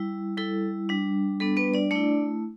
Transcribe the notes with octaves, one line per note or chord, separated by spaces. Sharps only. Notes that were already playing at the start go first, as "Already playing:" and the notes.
Already playing: G3 E4
G3 E4 A4
G3 D4
G3 B3 D4 A4
B3 B4
D4 D5
A3 D4 E4 D5